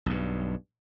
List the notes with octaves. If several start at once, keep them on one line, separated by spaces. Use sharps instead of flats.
B1 G2